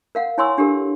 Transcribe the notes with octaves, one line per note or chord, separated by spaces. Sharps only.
A#4 F5 F#5
E4 C#5 G#5 C6 C#6 E6
D4 G4 A4 A#4